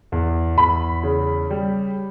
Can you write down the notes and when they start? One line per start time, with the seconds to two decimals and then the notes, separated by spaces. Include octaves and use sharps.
0.12 E2
0.58 E2 B5
1.03 C#3
1.50 G3